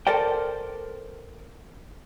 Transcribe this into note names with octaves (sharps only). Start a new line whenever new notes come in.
A4 A#4 C5 D5 G5